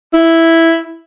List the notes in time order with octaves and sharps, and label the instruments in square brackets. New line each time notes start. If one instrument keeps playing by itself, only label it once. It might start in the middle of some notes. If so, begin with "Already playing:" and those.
[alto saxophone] E4